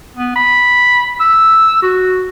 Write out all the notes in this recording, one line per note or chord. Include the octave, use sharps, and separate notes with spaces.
B3
B5
E6
F#4